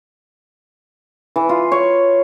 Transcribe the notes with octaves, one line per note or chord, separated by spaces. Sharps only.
E3
F4
C#5